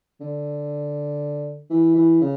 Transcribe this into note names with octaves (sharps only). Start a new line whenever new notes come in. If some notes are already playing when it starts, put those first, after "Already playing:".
D3
E3
E3
C#3